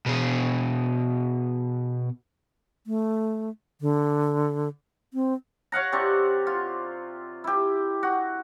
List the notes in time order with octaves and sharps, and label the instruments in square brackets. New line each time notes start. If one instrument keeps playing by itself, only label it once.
[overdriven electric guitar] B2 G#4
[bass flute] A3
D3
C4
[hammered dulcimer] C#5 F5 F#5 A#5
C3 C4 D5 C#6
F4
E4 G4
F#4